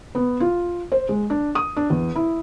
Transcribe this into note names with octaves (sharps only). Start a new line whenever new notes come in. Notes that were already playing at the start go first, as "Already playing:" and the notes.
B3
F4
C5
G#3
D4
D#6
D4
E2
E4